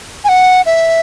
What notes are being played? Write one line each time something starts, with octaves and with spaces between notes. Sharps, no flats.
G#5
F#5
E5